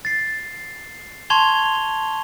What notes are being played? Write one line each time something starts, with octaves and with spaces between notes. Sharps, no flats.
A6 C7
A5 C6 C#6 G#6 F7 G7